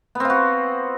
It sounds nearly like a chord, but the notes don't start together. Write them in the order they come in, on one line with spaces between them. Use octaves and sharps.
B3 C4 F4 F#4